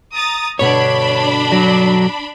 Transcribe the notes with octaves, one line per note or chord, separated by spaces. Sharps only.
A#5 D#6 A6
G2 B2 D3 D4 C#5 B5
F#3